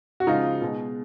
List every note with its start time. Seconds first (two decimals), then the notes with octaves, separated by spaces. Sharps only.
0.20 F#4
0.27 C#3 F3 G#3 D#4 F4
0.61 B2 G#3